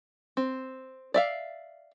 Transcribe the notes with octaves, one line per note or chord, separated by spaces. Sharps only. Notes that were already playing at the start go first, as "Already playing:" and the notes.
C4
D5 E5 F5